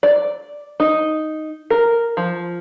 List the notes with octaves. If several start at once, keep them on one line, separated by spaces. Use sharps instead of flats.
D5
D#4
A#4
F3